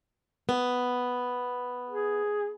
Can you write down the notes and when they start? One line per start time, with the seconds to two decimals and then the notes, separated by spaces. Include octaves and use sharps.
0.49 B3
1.89 G#4